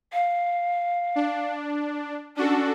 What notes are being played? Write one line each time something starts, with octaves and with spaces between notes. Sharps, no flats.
F5
D4
C#4 D4 F#4 A4